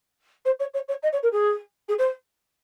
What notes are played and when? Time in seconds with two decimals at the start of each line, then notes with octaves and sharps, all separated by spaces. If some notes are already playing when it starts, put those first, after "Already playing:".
0.45 C5
0.59 C#5
0.74 C#5
0.88 C#5
1.02 D#5
1.12 C#5
1.23 A#4
1.32 G#4
1.88 G#4
1.98 C5